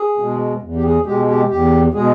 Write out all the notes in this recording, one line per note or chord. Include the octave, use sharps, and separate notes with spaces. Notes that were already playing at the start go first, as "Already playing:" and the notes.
Already playing: G#4
B2 G#3
E2
G4
G#4
B2 G#3 G4
G4
E2 G4
B2 G#3 G#4